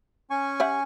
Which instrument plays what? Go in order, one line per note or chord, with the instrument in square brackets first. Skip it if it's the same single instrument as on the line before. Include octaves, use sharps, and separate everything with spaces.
[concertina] C#4 G#5 C#6
[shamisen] G4 E5 F#5